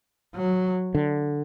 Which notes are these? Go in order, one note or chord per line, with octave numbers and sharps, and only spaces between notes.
F#3
D3